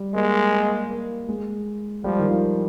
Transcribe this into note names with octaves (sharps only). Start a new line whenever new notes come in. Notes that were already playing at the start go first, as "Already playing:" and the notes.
Already playing: G3
G#3 A#3
A#3
A#3
G#3
F3 G3
D#3
F3